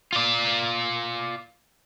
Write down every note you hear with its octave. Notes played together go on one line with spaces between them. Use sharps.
F4 D5